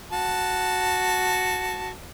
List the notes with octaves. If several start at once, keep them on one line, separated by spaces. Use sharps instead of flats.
F#4 A5